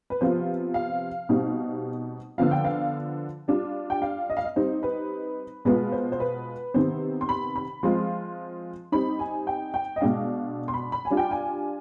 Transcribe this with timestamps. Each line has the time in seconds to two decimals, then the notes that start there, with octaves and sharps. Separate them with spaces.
0.10 B4
0.20 C3 F3 B3 F4 C5
0.74 F5
1.29 B2 G3 C4 D#4
2.38 D3 F3 B3 F4 F5
2.51 G5
2.65 F5
3.48 G3 D4 F4
3.90 G5
4.02 F5
4.30 D#5
4.37 F5
4.44 D#5
4.56 G3 C4 D#4 C5
4.83 B4
5.65 B2 G#3 B3 F4 B4
5.92 C5
6.12 C5
6.20 B4
6.74 C3 D#3 B3 C5
7.21 C6
7.29 B5
7.56 B5
7.83 F3 G#3 C4 F4 C6
8.92 G3 C4 D#4 B5
9.19 G#5
9.47 G5
9.74 G5
9.96 D#5
10.01 B2 G#3 D4 F5
10.68 C6
10.74 B5
10.92 B5
11.05 G#5
11.10 G3 D4 F4
11.17 G5
11.31 G#5